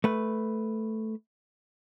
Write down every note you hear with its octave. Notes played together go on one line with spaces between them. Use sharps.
A3 B4